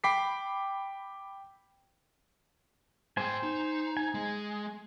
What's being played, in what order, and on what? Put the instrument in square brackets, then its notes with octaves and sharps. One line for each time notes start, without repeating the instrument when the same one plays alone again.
[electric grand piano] G5 B5 D6 B6 C7
[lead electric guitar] G#2 G5 [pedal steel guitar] C5 G#5
[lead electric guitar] D#4
[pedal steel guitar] G#5
[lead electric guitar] G#3